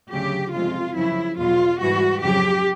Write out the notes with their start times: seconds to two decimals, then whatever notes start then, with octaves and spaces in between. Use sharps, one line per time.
0.11 D2 C#3 F#3 G4
0.52 F2 C3 F3 G#3 F4
0.95 F#2 C#3 F3 E4
1.38 E2 B2 F#3 F4
1.80 G#2 E3 G3 F#4
2.22 F2 C#3 F#3 G4